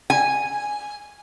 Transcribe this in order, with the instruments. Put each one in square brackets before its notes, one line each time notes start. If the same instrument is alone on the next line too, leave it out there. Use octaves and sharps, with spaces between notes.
[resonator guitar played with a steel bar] G#5